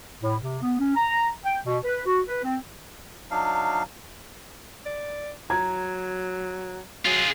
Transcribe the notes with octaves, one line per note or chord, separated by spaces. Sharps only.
A2
C3
B3
C#4
A#5
G5
B2
B4
F#4
B4
C4
F#3 D4 D#4 F5
D5
F#3 A#5 G#6
F#3 F4 G#4